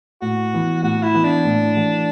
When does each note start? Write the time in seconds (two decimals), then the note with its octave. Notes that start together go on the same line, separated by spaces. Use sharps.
0.22 A2 F#4
0.53 E3 B3
0.83 A2 F#4
1.03 E4
1.14 E3 B3
1.24 D4
1.45 A2
1.75 E3 A3 F#4